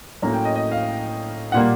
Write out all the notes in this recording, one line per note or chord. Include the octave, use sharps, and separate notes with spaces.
A2 F#3 A#3 C#4 A#5
G5
D#5
D#5
F5
A#2 G3 A#3 F#5